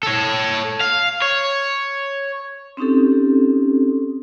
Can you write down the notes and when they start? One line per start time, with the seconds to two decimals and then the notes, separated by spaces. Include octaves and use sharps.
0.03 A4 C#5
0.80 F5
1.22 C#5
2.77 C4 C#4 D#4 G4 A4